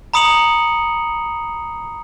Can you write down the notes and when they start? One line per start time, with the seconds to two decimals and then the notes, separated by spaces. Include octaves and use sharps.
0.14 A#5 B5 D#6 C#7 F7 F#7